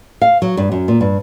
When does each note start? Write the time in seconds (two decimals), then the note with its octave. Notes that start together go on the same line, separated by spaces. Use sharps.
0.21 F5
0.42 F#3
0.57 G2
0.72 F#2
0.88 A#2
1.01 G2